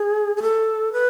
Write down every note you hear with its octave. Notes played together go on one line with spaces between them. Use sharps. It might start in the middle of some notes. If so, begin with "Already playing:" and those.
Already playing: G#4
G#4
A4
B4